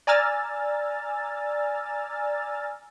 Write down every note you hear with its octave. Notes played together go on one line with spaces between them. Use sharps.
D5 G#5 A#5 E6 F6 A6